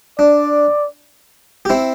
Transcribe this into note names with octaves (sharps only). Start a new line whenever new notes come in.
D4 D5
G4
C4 E4